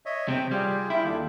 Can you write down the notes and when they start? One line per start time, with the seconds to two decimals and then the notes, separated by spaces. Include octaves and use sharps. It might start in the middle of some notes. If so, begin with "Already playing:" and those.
0.06 C#5 D#5 E5
0.28 C3 C4 G5
0.51 G3 F4 G4 G#4
0.90 E4 F4 G4 G5
1.04 D#2 D4 F4 A4